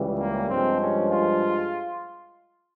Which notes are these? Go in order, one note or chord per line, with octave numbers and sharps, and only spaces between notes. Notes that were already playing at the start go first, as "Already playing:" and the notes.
Already playing: C#2 C#3 E3 G3
A#3
G2 F3 G#3 C4
C#4
F4